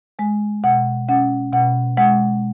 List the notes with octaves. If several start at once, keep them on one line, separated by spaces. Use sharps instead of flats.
G#3 G#5
B2 F#5
C#4 F#5
B2 F#5
G#3 F#5